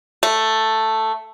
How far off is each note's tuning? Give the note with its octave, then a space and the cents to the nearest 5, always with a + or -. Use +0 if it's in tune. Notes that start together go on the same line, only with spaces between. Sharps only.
A3 +5